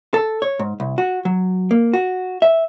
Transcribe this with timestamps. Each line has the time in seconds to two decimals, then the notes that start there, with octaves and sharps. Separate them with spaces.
0.14 A4
0.42 C#5
0.59 G#2
0.80 C2
0.98 F#4
1.25 F#3
1.71 A#3
1.93 F#4
2.42 E5